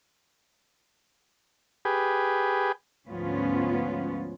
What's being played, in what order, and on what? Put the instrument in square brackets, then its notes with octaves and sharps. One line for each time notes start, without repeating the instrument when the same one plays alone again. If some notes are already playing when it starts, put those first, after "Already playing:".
[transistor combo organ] G4 G#4 B4
[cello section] D2 G#2 F3 B3 C#4 F4